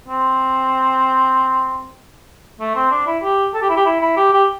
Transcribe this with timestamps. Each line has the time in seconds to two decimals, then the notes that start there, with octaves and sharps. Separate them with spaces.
0.09 C4
2.60 A3
2.76 C4
2.91 D4
3.07 E4
3.23 G4
3.54 A4
3.62 G4
3.70 E4
3.77 G4
3.86 E4
4.01 E4
4.17 G4
4.33 G4